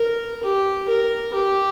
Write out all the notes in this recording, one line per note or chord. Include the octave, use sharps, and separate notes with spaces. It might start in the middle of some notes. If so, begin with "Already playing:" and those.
Already playing: A#4
G4
A#4
G4